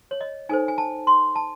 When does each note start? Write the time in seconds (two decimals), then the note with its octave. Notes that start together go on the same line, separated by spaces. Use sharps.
0.11 C#5
0.21 D#5
0.49 D#4 A4 C5 G#5
0.68 G#5
0.78 A5
1.07 C6
1.36 A5